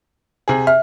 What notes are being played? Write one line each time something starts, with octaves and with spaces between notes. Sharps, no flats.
C3 G#4
E5 F6